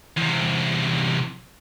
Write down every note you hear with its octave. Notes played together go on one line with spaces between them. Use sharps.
E2 C3